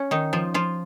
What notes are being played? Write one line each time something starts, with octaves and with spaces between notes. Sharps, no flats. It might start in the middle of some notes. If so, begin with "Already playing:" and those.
Already playing: C#4
D#3 D#4
F3 F4
F3 F4